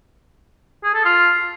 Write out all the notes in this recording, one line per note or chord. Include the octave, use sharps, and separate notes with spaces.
G#4
A4
F4